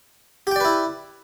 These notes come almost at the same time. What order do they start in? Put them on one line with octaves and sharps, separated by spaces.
G4 G5 D5 B4 E4